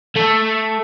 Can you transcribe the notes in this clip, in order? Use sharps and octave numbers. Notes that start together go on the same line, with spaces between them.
A3